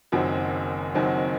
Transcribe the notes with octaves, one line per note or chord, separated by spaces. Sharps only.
F#1 F#2 D#3 F#3 C4
F#1 F#2 D#3 F#3 C4